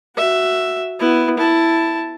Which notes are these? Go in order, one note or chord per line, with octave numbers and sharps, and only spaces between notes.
F#4 E5
B3 E4
E4 A5